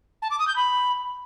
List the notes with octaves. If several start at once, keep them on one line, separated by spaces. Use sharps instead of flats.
A5
D6
D#6
G6
B5